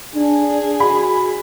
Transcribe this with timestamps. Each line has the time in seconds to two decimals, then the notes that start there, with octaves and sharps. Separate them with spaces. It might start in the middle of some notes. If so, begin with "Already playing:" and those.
0.16 D4 G#4
0.80 F#4 B5